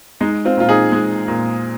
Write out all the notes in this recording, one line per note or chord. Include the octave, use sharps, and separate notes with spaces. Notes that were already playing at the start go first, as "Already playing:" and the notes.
G#3 D#4
C4 F4
A#2 F4
D#4 G#4
G#3
A#2